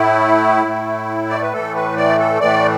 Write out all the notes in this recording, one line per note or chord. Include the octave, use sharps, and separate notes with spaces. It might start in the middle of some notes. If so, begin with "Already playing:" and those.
Already playing: A2 A3 E4
A2 A3
D5
B4
A2 E3 A3 A4
B4
D5
A4
A2 E3 A3 D5